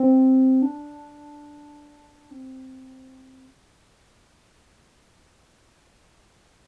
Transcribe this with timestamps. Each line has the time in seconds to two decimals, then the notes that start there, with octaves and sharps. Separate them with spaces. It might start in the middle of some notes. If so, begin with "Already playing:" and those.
Already playing: C4
0.62 D4
2.31 C4